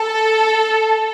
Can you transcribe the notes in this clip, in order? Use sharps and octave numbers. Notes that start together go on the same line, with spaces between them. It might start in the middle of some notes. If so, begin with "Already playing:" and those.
Already playing: A4